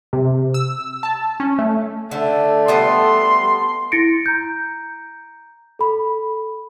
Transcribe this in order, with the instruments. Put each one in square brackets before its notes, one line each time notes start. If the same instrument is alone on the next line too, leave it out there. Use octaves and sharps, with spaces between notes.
[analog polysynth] C3
E6
A5
C#4
A3
[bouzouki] D3 [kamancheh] A3
[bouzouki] G3 B3 A4 [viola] C6
[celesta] E4 A6 A#6 C#7 D7
A#5 G6
A4 B5